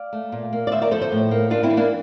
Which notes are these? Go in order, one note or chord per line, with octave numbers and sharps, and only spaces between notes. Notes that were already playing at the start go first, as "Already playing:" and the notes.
Already playing: D5 F5
A3
A#2
A#3
D5
D2 C5 E5
A#4 D5
F3 A4 C5
A4 C5
A2
A#3
A#3 D4 F4
C4 E4
E3
A#3 D4